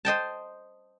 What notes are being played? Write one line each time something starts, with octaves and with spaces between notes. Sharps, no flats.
C5 D#5 G5 A5